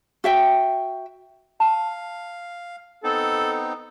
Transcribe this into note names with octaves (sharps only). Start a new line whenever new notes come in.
F#4 E5 G5
F5 A5
B3 C4 D#4 A4